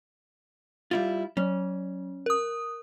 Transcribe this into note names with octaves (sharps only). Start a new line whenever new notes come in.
G3 E4 F4
F#3 C#4
A#4 D#6